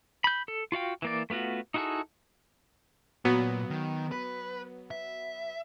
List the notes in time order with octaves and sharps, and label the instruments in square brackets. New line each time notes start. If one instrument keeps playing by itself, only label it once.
[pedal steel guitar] B5 G6
A4
F4 F#4 F5 G5
E3 A#3 D5
A3 B3 F4 F#4
D#4 E4 F#4 G#4 A4
[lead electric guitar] A#2 [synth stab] F#3 B3
[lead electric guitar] D#3
B4
E5